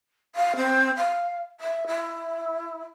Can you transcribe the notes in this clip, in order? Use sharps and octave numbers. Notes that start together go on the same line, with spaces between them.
F5
C4
F5
E5
E4